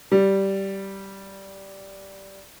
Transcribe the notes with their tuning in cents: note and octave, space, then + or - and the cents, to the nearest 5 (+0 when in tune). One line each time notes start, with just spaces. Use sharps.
G3 -10